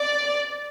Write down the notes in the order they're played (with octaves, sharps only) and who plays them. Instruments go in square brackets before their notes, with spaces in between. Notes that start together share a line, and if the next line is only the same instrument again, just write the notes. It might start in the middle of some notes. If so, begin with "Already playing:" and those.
Already playing: [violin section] D5